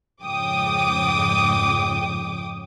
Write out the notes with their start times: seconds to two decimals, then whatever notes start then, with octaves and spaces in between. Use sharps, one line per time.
0.22 F2 G#2 C#3 G5 D6 D#6